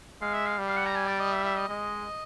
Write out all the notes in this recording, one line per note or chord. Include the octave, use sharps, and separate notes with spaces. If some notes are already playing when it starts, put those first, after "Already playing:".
G#3 F5
E5
F5
G3
F5
F#5
A#5
G#5
D5
D#5
E5
E5
D#5
G#3 D#5